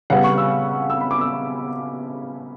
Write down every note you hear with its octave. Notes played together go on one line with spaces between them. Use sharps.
C#3 G3 B3 F#5
C#6
E6
E6
B5
D6
E6